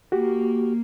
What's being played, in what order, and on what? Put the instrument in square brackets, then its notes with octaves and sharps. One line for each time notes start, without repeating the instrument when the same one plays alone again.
[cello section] A#3 [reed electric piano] F#4 G4